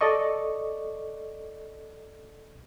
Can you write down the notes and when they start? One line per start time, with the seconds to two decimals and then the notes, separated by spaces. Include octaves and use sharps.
0.01 A4 D5 D#5 C#6